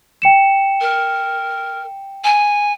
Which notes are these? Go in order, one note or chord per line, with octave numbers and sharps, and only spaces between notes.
G5 C#7 E7
A#4
G#5